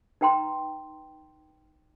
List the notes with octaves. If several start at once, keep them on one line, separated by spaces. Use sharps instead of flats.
D#4 B4 G5 A#5 C6